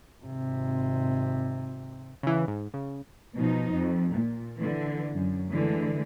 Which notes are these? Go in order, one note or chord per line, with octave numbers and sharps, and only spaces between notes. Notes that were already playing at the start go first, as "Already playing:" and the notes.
G#1 C3
C#3 E3
G#2
C#3
B2 F3 D#4
F2
A#2
D3 E3
F#2
D3 E3 G#3 A3